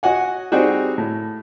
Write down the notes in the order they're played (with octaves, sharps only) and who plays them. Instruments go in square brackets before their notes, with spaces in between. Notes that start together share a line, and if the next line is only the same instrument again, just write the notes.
[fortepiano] F#4 D#5 F#5 G#5
G3 C4 D#4 F#4 G#4
A2